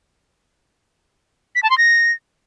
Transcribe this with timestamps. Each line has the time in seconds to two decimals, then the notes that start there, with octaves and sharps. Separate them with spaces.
1.55 B6
1.63 A5
1.70 C6
1.78 A#6